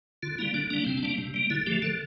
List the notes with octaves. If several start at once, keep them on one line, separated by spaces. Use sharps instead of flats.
D3 F4
G3 A#3 E4
D3 D4
G3 A#3 D4
C3 C4
D4
G3 A#3
C3
G3 A#3
D3 E4
F3 A3 G4
D3 A4